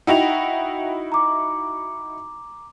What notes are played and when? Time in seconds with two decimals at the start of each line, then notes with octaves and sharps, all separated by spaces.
0.07 D#4 E4 F#4 F#5 G5 F7
1.12 A#5 D6